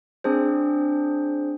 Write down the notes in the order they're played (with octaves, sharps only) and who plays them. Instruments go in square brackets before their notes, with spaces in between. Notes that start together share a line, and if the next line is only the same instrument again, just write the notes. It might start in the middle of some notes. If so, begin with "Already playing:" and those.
[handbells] C4 D4 G#4 C5